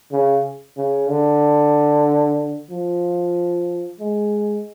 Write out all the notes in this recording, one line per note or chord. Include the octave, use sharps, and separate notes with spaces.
C#3
C#3
D3
F3
G#3